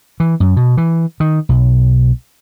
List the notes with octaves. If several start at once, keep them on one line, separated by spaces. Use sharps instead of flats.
E3
F#2
B2
E3
D#3
B1